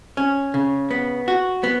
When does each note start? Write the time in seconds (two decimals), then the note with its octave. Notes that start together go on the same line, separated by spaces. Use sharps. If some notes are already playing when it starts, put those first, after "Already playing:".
0.17 C#4
0.54 C#3
0.91 B3
1.28 F#4
1.63 B3